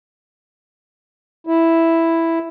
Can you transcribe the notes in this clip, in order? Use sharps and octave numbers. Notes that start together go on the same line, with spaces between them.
E4